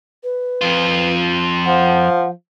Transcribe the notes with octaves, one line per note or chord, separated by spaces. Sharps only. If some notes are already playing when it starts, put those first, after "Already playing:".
B4
F2 F4
F3 F#5